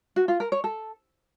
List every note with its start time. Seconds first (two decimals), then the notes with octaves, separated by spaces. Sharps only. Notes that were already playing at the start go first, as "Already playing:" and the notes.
0.16 F#4
0.28 F4
0.40 A#4
0.52 C#5
0.64 A4